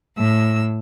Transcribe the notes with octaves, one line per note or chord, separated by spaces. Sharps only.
A2 E6